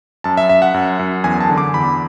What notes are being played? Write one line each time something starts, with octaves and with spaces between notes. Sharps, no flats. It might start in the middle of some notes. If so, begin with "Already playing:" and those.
F#2 A5
E5
F#2 E5
F#5
F#2
F#2
E2 G#5
A5
D3
D6
E2 B5